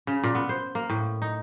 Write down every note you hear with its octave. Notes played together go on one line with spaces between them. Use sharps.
C#3
A#2
B3
C5
A#3
A2
D#4